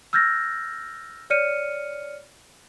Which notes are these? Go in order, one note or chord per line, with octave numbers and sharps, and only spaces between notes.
E6 F6 G6 A6 A#6
C#5 D5 F6 C#7 D#7